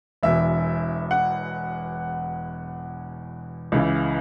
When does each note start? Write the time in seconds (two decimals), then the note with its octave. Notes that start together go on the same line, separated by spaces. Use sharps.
0.23 E1 E2 B2 E5
1.11 F#5
3.72 C#2 C#3 E3